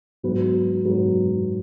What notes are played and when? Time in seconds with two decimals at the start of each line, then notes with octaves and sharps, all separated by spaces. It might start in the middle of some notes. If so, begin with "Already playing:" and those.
0.23 G#2 F#3 B3 F#4 B4
0.85 G#2 F#3 B3 F#4 B4